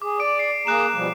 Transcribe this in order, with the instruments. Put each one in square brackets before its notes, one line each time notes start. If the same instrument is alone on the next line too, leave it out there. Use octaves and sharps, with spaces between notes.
[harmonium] G#4 [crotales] D6
[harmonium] D5 [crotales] D6 D7
[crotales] C7
[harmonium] A#3 G#4 A#5 [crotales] F#6 E7
[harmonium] B2 F3 G3